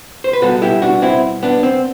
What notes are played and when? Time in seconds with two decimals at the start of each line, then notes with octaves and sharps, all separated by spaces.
0.24 C5
0.33 B4
0.42 B2 G3 B3 F#4 A4
0.62 E4 G4
0.82 D4 F#4
1.02 C4 E4
1.43 B3 D4
1.63 C4